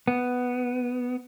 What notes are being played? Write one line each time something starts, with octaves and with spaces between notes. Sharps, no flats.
B3